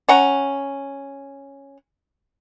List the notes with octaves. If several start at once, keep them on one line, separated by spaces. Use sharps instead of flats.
C#4 F#5 A#5